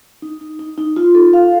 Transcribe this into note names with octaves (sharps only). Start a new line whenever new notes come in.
D#4
D#4
D#4
D#4
F4
A4
F5